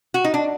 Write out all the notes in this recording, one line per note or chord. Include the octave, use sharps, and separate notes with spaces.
F#4
D#4
D4